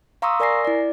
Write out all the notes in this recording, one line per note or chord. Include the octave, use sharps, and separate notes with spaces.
F5 A#5 C6 C#6 D#6 E6
A#4 D5 G#5 A#6 C7
E4 D5